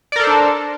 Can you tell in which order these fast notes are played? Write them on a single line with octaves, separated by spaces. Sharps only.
D5 A#4 A4 C5 D4